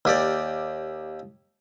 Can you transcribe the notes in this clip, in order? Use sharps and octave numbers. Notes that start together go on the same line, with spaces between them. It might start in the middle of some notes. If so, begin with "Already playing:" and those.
D#2 G4 D5